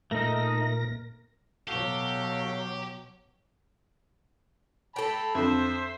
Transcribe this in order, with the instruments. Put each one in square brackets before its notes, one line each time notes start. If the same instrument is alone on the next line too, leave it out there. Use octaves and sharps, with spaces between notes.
[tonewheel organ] A#2 A#4 A#6 [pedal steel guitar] A3 D#4
[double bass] B2 F#3 [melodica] F#4 A4 F5 [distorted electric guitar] G4
[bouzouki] A4 G5 [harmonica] A5 B5
[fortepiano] F2 D3 [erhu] C5 [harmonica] E5